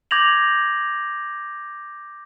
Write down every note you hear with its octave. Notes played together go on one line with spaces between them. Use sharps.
D6 G6 G#6 A#6 F7 F#7